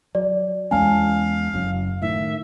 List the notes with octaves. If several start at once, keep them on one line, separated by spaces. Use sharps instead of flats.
F#3 D5
E2 G#3 C#4 F5 G#5 A5
F#1 F#2
A2 D#3 E5